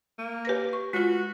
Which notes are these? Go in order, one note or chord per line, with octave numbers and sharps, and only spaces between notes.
A#3
G4 B4 A#6
C#6
G#3 F4 F#4